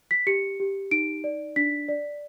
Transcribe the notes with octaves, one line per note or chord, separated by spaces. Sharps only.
B6
G4 C#7
G4
D#4 D7
D5
D4 B6
D5